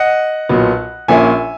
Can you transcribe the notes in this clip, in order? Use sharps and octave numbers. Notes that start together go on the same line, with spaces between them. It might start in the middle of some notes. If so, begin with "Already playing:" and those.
Already playing: D#5 F#5
B1 A#2 F#3 B3
A#1 A#2 A#3 C#4 E5 G#5